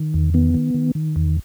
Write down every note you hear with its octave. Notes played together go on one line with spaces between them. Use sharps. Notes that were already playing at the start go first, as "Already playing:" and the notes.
Already playing: D#3
E2
D#3 B3
D#3
D#3
D#3
E2